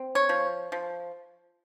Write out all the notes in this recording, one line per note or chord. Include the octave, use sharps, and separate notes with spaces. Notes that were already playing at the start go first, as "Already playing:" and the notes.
Already playing: C4
C#5
F3
F3